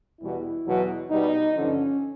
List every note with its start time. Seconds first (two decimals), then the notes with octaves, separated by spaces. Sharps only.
0.19 E2 B2 G3 E4
0.65 E2 B2 F#3
1.10 B2 G3 D#4
1.55 G2 D3 F3 C#4